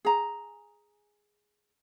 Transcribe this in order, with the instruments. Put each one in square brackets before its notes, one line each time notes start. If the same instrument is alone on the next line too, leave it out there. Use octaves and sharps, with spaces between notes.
[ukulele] G#4 A#5